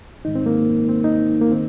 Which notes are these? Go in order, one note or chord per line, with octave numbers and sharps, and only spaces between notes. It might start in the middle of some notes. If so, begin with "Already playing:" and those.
G#2 D#3 G#3 D#4
C4
A#3
C4
D#4
A#3
D#3 C4